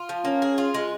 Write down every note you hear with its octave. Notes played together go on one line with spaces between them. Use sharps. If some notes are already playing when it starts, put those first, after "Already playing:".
Already playing: F4
F3
A#3 C#4
G#4
F4
G#3